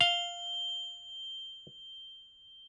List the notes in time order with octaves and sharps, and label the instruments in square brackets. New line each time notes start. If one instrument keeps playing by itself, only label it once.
[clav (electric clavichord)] F5 [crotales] G7